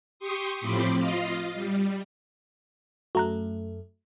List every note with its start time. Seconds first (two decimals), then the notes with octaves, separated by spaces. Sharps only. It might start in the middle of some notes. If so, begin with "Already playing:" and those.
0.19 G4 C6 C#6 D#6
0.61 A2 F3 C4 B5 C6 D6
0.99 F4 D#5 F5
1.54 G3
3.15 F#2 A3 F#4 A#5 F#6